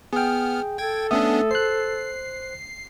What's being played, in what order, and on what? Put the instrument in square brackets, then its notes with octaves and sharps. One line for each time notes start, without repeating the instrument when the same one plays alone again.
[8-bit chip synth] B3 F6 [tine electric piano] G#4 G5
[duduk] A4 [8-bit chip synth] G5 G#6
[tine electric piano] A3 E5 D#6 [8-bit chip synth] B3 C#4 D4
[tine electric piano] C5 F#6 [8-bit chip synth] C7